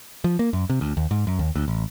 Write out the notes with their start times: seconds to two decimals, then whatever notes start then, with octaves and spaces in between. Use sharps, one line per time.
0.24 F3
0.39 A#3
0.53 F#2
0.70 C3
0.81 D2
0.97 D#2
1.11 G#2
1.27 F#2
1.39 D#2
1.56 D2
1.68 A1